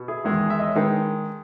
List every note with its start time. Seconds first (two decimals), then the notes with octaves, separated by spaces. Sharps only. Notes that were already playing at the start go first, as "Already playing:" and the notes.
Already playing: B2
0.08 E4 G#4
0.25 E2 D#3 G#3
0.50 E5
0.59 D#5
0.67 C#5
0.75 D#3 G#3 G#4 B4